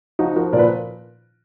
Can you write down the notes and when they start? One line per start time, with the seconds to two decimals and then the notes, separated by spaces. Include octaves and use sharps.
0.19 F3 D#4 F#4
0.36 F3 F#4 A#4
0.53 A#2 A#4 D5
0.59 B4